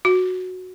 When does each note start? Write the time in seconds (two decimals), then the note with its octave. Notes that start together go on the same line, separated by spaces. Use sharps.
0.05 F#4